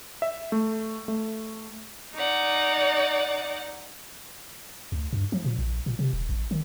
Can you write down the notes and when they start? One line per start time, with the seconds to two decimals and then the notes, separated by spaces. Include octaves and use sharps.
0.22 E5
0.52 A3
1.08 A3
2.14 D#4 D5 F#5
4.92 D2
5.13 G2
5.32 F3
5.45 A#2
5.59 A#1
5.86 A#2
5.99 C3
6.13 D#1
6.29 A1
6.51 D#3